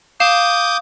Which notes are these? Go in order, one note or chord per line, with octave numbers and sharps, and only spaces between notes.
F5 D6 D#6 G6 E7